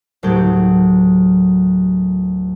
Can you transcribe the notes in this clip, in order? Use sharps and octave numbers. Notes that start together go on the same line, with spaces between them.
F#1 D2 A2 F#3 G4 G6